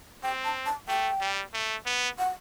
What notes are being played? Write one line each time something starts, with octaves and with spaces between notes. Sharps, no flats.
C4 G5
A5
A5
A3 G5
G3
A3
B3
F#5